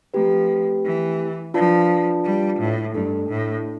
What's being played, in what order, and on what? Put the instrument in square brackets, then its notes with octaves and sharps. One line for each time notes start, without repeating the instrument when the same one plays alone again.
[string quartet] F3 [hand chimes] A3 C4 G4 B4
[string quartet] E3
[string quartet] F3 [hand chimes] D4 F4 B4 D5 A5
[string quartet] G3
A2
[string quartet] G2 [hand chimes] A3 D4 A4
[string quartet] A2